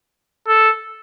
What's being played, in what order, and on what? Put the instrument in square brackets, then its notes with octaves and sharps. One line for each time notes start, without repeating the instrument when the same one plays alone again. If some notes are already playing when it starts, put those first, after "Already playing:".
[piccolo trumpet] A4